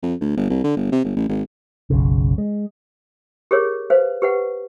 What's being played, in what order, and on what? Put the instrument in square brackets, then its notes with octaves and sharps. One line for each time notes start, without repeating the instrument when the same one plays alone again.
[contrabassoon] F2
D2
G1
C2
D3
G1
C3
G1
A1
G#1
[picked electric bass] F#1 B1 C#3
G#3
[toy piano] G4 G#4 A#4 C#5
B4 C5 F5
G4 B4 F#5